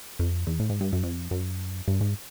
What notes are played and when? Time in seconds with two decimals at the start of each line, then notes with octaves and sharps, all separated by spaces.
0.19 F2
0.47 E2
0.60 A2
0.70 G#2
0.80 G2
0.93 F#2
1.03 F2
1.31 F#2
1.88 G2
2.01 G#2